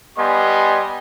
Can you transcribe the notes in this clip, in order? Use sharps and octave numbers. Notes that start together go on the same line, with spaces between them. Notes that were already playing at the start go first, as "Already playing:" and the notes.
G3 B3 G4 D#5 G#5 C6